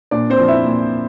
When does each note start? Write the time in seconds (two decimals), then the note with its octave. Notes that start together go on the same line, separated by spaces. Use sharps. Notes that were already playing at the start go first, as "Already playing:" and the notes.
0.11 A#2 D4 D5
0.30 C4 C5
0.39 F3
0.48 E4 E5
0.66 A#2